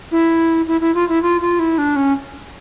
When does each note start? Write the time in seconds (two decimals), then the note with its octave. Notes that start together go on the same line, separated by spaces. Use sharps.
0.12 E4
0.68 E4
0.81 E4
0.95 F4
1.09 E4
1.23 F4
1.41 F4
1.59 E4
1.78 D4
1.96 C#4